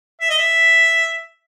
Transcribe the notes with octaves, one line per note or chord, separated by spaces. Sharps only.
E5
D#5
E5